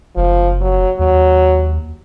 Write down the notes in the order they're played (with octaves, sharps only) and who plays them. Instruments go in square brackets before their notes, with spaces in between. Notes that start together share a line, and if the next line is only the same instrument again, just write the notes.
[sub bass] F#1 [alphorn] F3
[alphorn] F#3
[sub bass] D#2 [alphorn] F#3